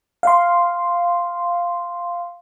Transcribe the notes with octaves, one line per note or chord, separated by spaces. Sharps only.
F5 C6